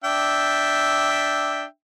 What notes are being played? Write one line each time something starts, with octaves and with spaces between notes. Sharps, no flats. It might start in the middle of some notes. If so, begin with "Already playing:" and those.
D4 E5 G5